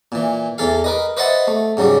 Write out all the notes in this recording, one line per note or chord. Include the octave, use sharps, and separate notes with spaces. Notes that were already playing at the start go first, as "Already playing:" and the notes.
A#2 E3
E2 E3 A4 F5
A#4 B4 D#5
B4 C5 D#5 E5 F#5 A5
A3
G#2 C#3 F#3 G3